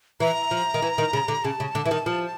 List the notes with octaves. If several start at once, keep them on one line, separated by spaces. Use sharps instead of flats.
E3 A#5
F3
D#3
E3
D#3
C#3
D3
C#3 A5
C#3
D3
E3
D#3
F3